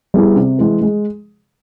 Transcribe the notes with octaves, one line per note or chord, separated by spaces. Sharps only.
G3 B3 E4 G#4
C3
E3 G#3
G#3